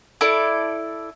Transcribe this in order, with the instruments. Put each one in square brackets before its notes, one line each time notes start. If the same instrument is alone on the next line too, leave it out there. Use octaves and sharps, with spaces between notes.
[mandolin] E4 A4 D5